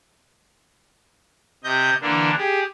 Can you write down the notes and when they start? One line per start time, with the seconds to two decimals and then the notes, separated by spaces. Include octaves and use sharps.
1.64 C3 D#5 G6
2.01 D3 E3 A#3 D4
2.37 G4 G#4